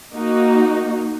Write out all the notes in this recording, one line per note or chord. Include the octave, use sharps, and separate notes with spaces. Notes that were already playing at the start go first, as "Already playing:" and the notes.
A#3 D#4 F#4